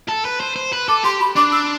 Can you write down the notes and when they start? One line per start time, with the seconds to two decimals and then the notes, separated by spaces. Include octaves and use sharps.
0.08 A4
0.25 B4
0.40 C5
0.56 C5
0.73 B4
0.88 A4 D6
1.04 G4 C6
1.21 B5
1.36 D4 D6
1.52 E6